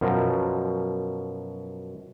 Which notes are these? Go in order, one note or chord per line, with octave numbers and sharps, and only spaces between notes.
F#2 B2 F3 A#4